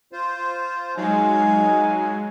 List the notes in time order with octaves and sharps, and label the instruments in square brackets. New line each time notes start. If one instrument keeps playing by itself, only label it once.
[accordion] F4 C5
[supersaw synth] F#3 G#3 [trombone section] D#4 [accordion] F5 [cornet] G#5